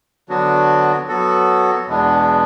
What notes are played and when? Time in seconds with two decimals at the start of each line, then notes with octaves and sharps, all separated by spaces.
0.29 D3 F#3 B3 D4 F#4
1.08 F#3 B3 F#4 A4
1.87 E2 B2 G#3 B3 D4